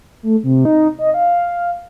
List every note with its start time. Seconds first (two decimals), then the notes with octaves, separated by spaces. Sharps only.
0.23 A3
0.43 C3
0.65 D#4
0.99 D#5
1.14 F5